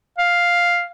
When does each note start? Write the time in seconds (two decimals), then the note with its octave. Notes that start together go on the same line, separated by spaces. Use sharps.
0.18 F5